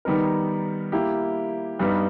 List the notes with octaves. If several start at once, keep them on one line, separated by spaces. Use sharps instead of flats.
D#3 G3 B3 D#4 A#4
A#3 E4 G4
G2 G3 B3 D#4